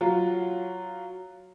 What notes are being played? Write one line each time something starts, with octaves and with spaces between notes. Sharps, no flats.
F#3 F4